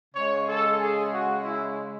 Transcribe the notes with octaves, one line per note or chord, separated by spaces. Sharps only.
C#3 G#3 C#5
A4
G#4
F#4
E4